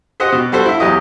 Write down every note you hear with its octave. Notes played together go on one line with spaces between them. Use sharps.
G4 C5 D#5 F#5
B2
G3 F#4 A4 C5
E4 E5
E2 F#3 G4 D#5